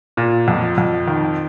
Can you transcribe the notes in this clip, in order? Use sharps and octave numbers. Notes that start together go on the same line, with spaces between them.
A#2
F2
F2
D#3